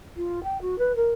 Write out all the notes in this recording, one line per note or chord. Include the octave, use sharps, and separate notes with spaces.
F4
G5
F#4
B4
A#4